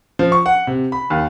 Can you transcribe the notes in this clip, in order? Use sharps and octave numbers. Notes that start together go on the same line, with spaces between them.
F3
C#6
F#5
C3
B5
D#2